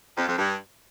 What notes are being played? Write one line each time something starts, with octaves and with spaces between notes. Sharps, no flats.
F2
F2
G2